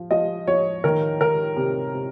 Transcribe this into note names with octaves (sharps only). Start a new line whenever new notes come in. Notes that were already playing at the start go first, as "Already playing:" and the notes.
Already playing: F3
F3 D#5
F3 C#5
D#3 A#4
D#3 A#4
C3
C3